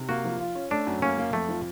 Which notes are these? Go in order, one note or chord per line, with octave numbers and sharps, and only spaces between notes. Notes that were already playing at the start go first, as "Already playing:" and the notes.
Already playing: C3
A#3 F#4
F3
F4
C#4
A3 D4
F#2
A#3 C#4
A#3
F2 A3
F3